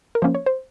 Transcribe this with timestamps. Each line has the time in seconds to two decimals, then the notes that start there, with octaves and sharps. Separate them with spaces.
0.15 A#4
0.22 F3 A#3 C#4 C5
0.35 C#5
0.46 C5